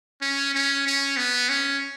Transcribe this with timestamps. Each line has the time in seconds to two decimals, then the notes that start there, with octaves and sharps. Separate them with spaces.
0.22 C#4
0.54 C#4
0.86 C#4
1.17 B3
1.49 C#4